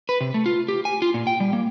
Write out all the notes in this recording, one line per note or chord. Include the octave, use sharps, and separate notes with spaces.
B4
C3
A3
F4
G4
G#5
F4
A#2
G5
G3
A#3